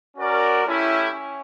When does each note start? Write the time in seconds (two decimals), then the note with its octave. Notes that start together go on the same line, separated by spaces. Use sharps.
0.16 C#4 F#4 A#4 D5
0.64 A3 C#4 E4 G4
1.11 C#4